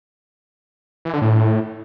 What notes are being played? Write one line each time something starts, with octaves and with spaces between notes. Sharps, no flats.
E3
D3
A2